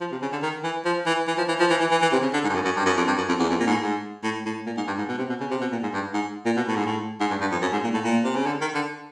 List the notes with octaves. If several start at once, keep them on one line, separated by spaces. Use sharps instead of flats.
F3
C3
C#3
D3
D#3
E3
F3
E3
E3
F3
E3
F3
E3
E3
E3
E3
C3
C#3
D3
G#2
G2
F#2
F#2
G2
F#2
F2
G2
F#2
F2
E2
F2
A#2
G#2
A2
G#2
A2
A2
A#2
G#2
G2
G#2
B2
C3
B2
C#3
C3
B2
A#2
G#2
G2
G#2
A#2
B2
A2
G#2
A2
G#2
G2
G2
F2
F#2
G#2
A#2
A2
A#2
C3
C#3
D3
D#3
D3